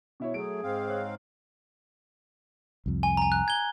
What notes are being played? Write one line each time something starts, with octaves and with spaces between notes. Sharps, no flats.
B2 E4 C#5
F#3 A3 G#4 D7
G#2 C4 F5
C#5 F#6
C2 F2
G#5
G#5 A#5
F#6
G#6 G7